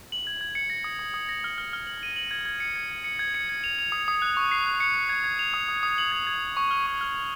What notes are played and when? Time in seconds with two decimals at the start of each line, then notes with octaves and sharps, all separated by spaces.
0.12 F#7
0.27 G#6
0.41 G#6
0.55 C#7
0.70 A#6
0.84 D#6
0.99 D#6
1.14 D#6
1.29 A#6
1.44 F6
1.58 F6
1.73 F6
1.87 F#7
2.03 D#7
2.16 F#7
2.31 G#6
2.46 G#6
2.60 C#7
2.76 G#6
2.90 C#7
3.04 C#7
3.19 G#6
3.34 C#7
3.49 G#6
3.64 F7
3.79 F7
3.92 D#6
4.08 D#6
4.22 F#6
4.37 C#6
4.52 C7
4.66 F#6
4.80 C#7
4.96 C#7
5.09 G#6
5.24 G#6
5.39 F7
5.54 D#6
5.69 D#6
5.83 D#6
5.98 F#7
6.12 G#6
6.27 G#6
6.42 F#7
6.57 C#6
6.71 F6
6.86 C#6
7.01 F6
7.15 F7